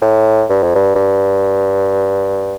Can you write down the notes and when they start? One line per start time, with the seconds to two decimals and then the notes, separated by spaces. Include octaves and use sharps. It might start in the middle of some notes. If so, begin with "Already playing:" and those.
0.02 A2
0.49 G2
0.63 F2
0.75 G2
0.95 G2